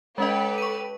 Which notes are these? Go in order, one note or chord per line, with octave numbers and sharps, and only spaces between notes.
G#3 C#4 G4 A4 B4 D#5
C#6 D#7